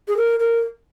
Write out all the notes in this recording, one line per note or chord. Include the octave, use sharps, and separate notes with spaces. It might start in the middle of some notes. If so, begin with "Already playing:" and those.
G#4
A#4
A#4